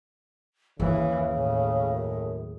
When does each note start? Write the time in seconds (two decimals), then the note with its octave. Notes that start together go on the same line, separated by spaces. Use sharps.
0.80 D#2 C#3 E3 G#4
1.34 A2
1.90 F#2